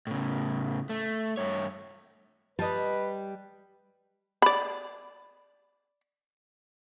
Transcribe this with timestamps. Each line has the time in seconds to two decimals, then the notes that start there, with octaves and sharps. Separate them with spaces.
0.07 A2 C#3
0.89 A3
1.37 G2 C#5
2.59 G3 B4 D#5 A5
4.42 D5 B5